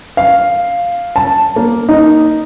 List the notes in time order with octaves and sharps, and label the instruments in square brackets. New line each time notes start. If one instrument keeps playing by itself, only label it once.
[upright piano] F5
A5
A#3
D#4